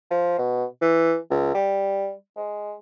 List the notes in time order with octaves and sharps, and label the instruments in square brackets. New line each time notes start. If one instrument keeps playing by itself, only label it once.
[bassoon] F3
B2
E3
C#2
G3
G#3